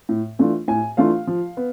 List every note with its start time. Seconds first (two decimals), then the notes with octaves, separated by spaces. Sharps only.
0.09 A2
0.39 E3 A3 D4 F4
0.68 A2 G#5
0.97 E3 A3 D4 F4 F5
1.27 F3
1.57 B3